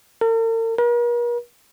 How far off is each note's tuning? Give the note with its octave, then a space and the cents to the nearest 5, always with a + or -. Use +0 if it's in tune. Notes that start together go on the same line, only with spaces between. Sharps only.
A#4 -45
A#4 +45